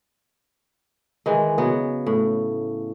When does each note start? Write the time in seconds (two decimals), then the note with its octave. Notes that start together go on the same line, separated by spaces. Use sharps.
1.26 D#3 E3 G#3
1.58 C#3 F#3 B3
2.07 A2